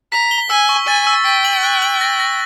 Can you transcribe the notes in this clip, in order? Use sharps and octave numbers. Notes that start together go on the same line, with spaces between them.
A#5 B6
G7
G#5 E6
C#6
G#5 A6
E6
G5 B6
F#7
F#6
F#7
A#6
A#6